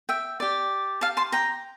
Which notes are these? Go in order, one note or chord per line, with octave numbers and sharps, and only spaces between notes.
E5 G5
G4 D5
F5 A5
A5 C6
G5 A#5